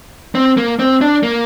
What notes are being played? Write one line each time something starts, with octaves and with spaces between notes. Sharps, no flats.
C4
A#3
C4
D4
A#3